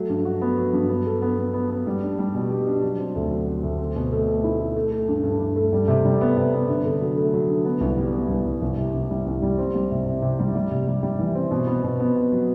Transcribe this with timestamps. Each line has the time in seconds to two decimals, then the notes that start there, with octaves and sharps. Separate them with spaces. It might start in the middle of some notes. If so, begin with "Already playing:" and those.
Already playing: F#3 A3
0.09 G2
0.25 F#4
0.42 B3
0.58 F#3
0.73 G2
0.90 B3
1.06 A4
1.22 B3
1.38 B3
1.54 B3
1.70 B3
1.87 G3
2.03 D4
2.19 G3
2.34 B2
2.50 G4
2.67 D4
2.82 F#3
2.99 C4
3.15 D2
3.31 F#3
3.47 C4
3.63 D2
3.79 C4
3.96 B2
4.12 A3
4.28 A3
4.44 E4
4.60 E4
4.76 A3
4.92 A3
5.08 G2
5.23 G2
5.40 G2
5.56 A3
5.73 G3
5.88 C3
6.05 G3
6.21 B3
6.37 C3
6.53 B3
6.69 D3
6.85 D3
7.01 F#3
7.18 A3
7.34 F#3
7.49 D3
7.65 B3
7.81 C2
7.97 G3
8.13 B3
8.29 C2
8.46 C2
8.62 C2
8.77 C3
8.94 C2
9.10 G3
9.26 C2
9.42 G3
9.58 C4
9.75 G3
9.91 C3
10.06 C3
10.22 C3
10.39 G3
10.55 G3
10.71 C3
10.87 G3
11.03 G3
11.19 E3
11.35 C4
11.51 B2
11.67 B3
11.84 B2
12.00 B3
12.16 B3
12.32 F#3